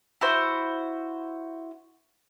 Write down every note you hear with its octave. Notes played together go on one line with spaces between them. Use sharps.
E4 F#4 C5